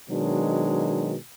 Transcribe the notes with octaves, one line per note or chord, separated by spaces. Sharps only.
B2 D#3 F#3 G#3 D4